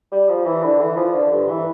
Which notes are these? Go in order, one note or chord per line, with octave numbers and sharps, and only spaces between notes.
G3
F3
E3
D3
E3
F3
D3
G2
E3